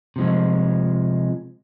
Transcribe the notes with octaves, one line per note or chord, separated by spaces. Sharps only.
C3 F3 G#3